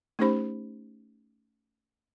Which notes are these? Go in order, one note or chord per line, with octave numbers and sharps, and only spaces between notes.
A3 C#4 D#4 G4 C5 B5